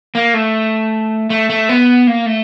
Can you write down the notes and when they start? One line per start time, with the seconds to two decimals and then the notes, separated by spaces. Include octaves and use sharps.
0.15 A#3
0.34 A3
1.30 A3
1.50 A3
1.69 B3
2.07 A#3
2.26 A3